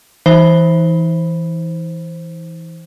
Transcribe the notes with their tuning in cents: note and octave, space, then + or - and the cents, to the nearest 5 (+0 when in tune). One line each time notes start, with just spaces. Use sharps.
E3 +0 D#4 +40 C5 +5